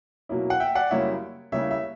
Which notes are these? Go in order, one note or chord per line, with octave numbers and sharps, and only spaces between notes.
B2 F#3 A#3 C#4 E4
F#5
E5 G5
D5 F#5
F#2 C#3 G3 A#3 E4 C#5 E5
C#3 G3 A#3 C#4 E4 C#5 E5
E5